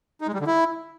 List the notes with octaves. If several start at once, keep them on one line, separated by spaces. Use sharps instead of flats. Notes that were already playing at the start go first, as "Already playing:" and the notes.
D#4
G#3
G3
D3
E4